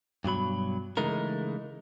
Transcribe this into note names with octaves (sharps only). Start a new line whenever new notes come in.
G2 B2 F#3 B5
C#3 E3 G#3 A3 D#4 A#4